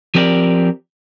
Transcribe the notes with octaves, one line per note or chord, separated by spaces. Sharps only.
F3 C4 G4 A#4 C5 D5